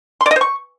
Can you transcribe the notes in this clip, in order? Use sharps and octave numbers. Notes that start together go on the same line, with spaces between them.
C6
D5
D#5
C5
C#6